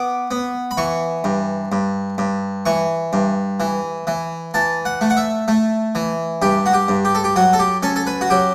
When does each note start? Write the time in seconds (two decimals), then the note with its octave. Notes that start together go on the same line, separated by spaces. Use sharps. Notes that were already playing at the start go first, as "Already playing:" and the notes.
Already playing: B3 D6
0.31 B3
0.71 B5
0.77 E3 C#6
1.24 G2
1.72 G2
2.18 G2
2.66 E3 C#6
3.13 G2
3.60 E3
4.07 E3
4.54 E3 A5
4.85 F#5
5.01 A3
5.10 F#5
5.17 E5
5.48 A3
5.95 E3
6.42 G2 G4
6.66 F#4
6.73 G4
6.88 G2
7.05 G4
7.15 A4
7.24 G4
7.36 F#3 F#4
7.53 A4
7.59 G4
7.83 C#4 A4
7.96 A4
8.07 B4
8.21 F#4
8.30 F#3 G4